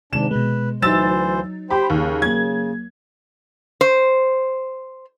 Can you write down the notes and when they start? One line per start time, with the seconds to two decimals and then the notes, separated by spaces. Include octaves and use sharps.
0.13 G#2 C3 D#3 G#3 D4 E7
0.31 B2 G#3 B4
0.82 D2 E3 F#3 D#4 C5 E6 A6 E7
1.70 G4 C5 G5 B5
1.90 D#2 C#3
2.22 F#3 A#3 G#6
3.81 C5